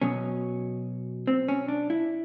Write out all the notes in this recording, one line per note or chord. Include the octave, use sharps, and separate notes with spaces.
B2 F#3 C#4
C4
C#4
D4
E4